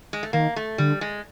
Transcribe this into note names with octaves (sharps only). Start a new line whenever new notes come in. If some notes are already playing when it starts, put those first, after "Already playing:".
G#3
A3
D#3 A#3
A3
D3 G3
G#3